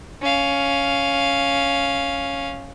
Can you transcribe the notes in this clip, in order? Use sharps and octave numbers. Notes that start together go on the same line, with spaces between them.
C#4 F5